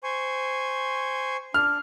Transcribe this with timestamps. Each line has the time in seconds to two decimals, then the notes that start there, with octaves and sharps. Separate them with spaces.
0.03 C5 G#5 C#6
1.54 D4 F6